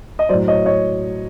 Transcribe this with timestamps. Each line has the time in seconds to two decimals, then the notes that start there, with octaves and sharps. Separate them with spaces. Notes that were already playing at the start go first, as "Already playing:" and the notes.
0.19 D#5
0.29 A2 F#3 C5 D5
0.48 C#5 D#5
0.66 C#5 D#5